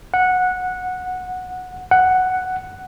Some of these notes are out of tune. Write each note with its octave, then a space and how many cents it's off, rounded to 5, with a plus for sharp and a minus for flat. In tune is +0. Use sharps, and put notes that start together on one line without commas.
F#5 -10
F#5 +5